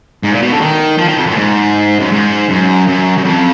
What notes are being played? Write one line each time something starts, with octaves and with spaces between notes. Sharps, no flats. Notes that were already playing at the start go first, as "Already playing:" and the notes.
G#2
A#2
B2
D3
D#3
F3
D#3
F2
F#2
A#2
G#2
F#2
G#2
F#2
F#2
F#2
F2